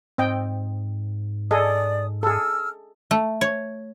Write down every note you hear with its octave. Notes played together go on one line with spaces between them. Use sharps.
G#2 C4 D#5 G5
G#4 A4 D5 D#5 D#6
G#4 A4 E6 F6
A3
C#5